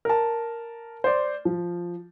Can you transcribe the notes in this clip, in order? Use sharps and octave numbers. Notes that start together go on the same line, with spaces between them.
A#4 A5
C5 D5
F3